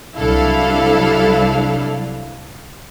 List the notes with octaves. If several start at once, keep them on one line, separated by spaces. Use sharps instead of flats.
C2 F#3 D4 E4 A4 F5